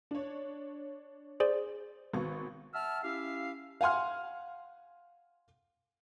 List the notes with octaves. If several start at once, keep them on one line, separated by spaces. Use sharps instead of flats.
D4 C#5
G#4 C5 D5
G#1 B3 C#6
E5 F#5 A5 E6 F6
C#4 E4 G4 E5 F5
F5 F#5 G#5 C6 F6